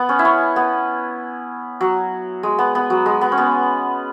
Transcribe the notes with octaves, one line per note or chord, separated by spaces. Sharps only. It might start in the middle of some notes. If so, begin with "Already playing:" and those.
Already playing: B3
C#4
E4
C#4
B3
F#3
G#3
B3
B3
F#3
G#3
B3
C#4
B3